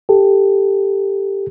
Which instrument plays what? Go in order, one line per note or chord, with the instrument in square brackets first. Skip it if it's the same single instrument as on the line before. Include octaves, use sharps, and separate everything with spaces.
[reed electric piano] G4 A4